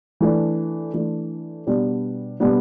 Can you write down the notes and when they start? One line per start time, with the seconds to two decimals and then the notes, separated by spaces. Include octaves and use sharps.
0.21 E3 A3 D4
0.94 E3 A3 D4
1.67 B2 G3 B3 D4
2.40 B2 G3 B3 D4